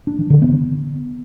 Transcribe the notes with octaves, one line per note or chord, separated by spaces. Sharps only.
D4
E3
D3
B3